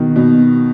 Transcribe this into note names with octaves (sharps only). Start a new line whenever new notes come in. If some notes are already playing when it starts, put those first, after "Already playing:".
Already playing: B2 D#3
B2